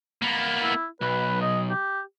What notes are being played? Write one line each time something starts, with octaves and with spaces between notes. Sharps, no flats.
A#3 B3
E4
B1 B4
D#5
G4